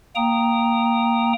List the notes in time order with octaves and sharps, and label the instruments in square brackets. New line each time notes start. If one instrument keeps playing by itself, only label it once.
[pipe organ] A#3 G5 A#5 D#6